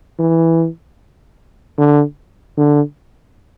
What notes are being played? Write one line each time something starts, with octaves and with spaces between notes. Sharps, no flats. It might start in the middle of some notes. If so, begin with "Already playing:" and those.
E3
D3
D3